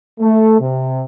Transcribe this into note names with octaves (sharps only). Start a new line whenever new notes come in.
A3
C3